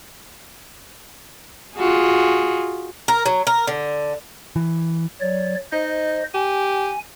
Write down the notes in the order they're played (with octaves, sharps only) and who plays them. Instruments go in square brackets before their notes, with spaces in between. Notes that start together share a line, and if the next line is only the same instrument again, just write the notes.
[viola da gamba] F4 F#4 G#4
[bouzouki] A#4
F#3
A#4
D3
[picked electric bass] E3
[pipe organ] F#3 C#5 D5
[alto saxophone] D#4 [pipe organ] C5 D#5
[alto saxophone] G4 [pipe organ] G#5